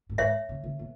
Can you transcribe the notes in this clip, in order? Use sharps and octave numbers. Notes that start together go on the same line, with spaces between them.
A2
G#2 C#5 E5
C#3
C#3
B2